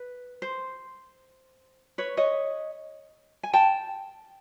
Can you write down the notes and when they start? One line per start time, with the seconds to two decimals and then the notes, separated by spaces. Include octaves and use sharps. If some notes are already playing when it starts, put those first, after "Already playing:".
Already playing: B4
0.42 C5
1.98 B4 C#5
2.17 C#5 D#5
3.43 G#5
3.53 G5 A5